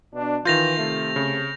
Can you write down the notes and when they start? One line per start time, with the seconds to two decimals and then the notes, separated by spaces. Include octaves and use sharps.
0.13 B2 D4
0.45 D#3 E3 F4 G6 A#6 F7
0.77 C3 A3
1.16 C#3